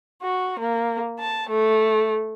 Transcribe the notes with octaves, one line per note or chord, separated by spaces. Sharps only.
F#4
A#3
A5
A3